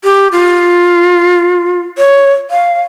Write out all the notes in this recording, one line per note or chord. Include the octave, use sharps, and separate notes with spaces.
G4
F4
C#5
F5